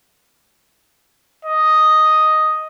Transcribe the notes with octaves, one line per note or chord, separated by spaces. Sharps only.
D#5